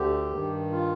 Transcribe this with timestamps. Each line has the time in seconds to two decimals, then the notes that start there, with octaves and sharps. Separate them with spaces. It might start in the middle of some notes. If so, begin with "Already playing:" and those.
Already playing: D2 D3 G4
0.31 G2 D#3
0.72 F4